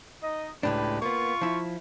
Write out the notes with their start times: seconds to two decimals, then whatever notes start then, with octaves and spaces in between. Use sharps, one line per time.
0.23 D#4 D#5
0.63 C#2 A2 G#3 D4 G4 B4
1.02 A#3 B3 F4 C#6
1.41 F3 E4